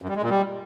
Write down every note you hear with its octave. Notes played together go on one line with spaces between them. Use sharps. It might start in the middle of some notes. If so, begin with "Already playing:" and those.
F#2
G3
G#3
A#2
G3